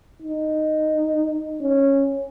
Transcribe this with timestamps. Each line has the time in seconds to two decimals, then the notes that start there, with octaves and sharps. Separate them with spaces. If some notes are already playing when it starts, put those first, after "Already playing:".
0.22 D#4
1.61 C#4